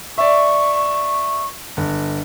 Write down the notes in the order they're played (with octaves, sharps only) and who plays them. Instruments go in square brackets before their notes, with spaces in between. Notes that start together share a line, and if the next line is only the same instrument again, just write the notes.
[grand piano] D5 E5 [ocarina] C#6
[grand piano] G1